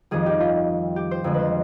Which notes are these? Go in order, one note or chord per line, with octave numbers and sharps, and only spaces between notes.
F2 D#3 G3 G#4
G4
F4
G4
C5
F2 D3 G#3
B4 C5